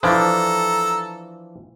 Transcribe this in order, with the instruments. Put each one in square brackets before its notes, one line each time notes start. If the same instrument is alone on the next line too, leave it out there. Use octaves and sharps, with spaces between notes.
[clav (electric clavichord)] E3 F3 D4 [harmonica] A4 A#5 E6